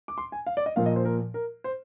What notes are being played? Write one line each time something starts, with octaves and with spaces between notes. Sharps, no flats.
D6
C6
G#5
F5
D5
D#5
A#2 F3 A#3 F5
D#5
C5
A#4
A#4
C5